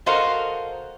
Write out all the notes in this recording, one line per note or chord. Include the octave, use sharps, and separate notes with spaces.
F#4 A4 A#4 C5 D#5 F5